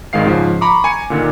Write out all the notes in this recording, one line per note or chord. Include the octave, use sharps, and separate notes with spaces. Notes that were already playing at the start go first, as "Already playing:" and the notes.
G#1 D#3 G#3 F5 C7
G#2 C#3 F3
A#5 B5 C#6 D6
G#5 A#5 C#7
A#2 D3 D#3